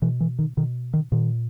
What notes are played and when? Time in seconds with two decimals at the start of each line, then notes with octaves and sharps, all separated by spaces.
0.02 B2 E3
0.20 E3
0.39 D#3
0.57 B2 D#3
0.93 D#3
1.12 A#2 D#3